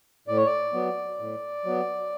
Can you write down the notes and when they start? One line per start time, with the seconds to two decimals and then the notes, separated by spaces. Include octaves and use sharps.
0.28 A2 D5
0.37 C#5
0.46 D5
0.73 F#3 B3
1.19 A2
1.65 F#3 B3